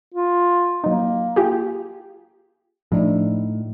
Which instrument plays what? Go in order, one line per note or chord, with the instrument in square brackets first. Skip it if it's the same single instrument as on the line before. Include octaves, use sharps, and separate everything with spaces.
[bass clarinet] F4
[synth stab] F#3 D#4 [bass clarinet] A#3
[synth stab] F4 G4 G#4
[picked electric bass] A2 [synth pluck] F3 D4 D#4